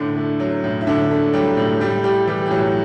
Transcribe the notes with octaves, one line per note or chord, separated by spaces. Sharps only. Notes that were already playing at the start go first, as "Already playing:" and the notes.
Already playing: A2 D3 D4
A3
F#3
A2
E4
A2 D3 D4
A3
F#3 G3 G4
A2
A2 G3 G4
G3 G4
E3 G3 G4
G4
A2 F#3 F#4